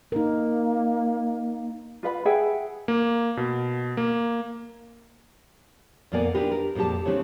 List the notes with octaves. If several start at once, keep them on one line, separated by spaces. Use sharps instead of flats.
A#3 D#4 A#4
F4 B4 F#5 B5
G#4 E5 F#5 G5
A#3
B2
A#3
F2 A#2 A#3 B3 D5 G#5
D4 D#4 F4 G4 A#4 B4
A#4
F2 A#2 G#3 G4 A5
C#3 E3 G3 A3 C4 D4